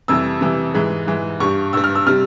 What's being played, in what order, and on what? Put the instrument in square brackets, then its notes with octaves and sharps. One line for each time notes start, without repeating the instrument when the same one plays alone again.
[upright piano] F2 C3 E3 G3 E6
F2 C3 E3 G3
G#2 E3 G#3
G#2 E3 G#3
G2 G3 C#6
G2 G3 E6
F6
E6
C3 G3 F6